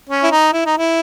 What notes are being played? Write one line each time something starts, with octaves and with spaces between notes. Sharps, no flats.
C#4
E4
D#4
E4
D#4
E4